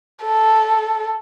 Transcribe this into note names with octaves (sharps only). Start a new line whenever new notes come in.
A4